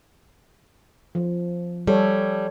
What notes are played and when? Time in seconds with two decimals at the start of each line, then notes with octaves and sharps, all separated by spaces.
1.15 F3
1.87 G3 A4 C#5